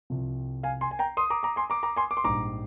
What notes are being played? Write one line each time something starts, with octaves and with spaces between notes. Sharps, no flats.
C2 C3 F3
F5 G#5
G#5 C6
G#5
G5 A#5
C6 D#6
A#5 D6
A#5 D6
G#5 C6
A#5 D6
A#5 D6
G#5 C6
D6
C6
A#1 G#2 G3 A#5 D6